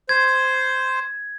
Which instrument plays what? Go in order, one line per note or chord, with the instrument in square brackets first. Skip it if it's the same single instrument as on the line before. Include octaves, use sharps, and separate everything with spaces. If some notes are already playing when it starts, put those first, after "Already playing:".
[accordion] C5 [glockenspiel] G#6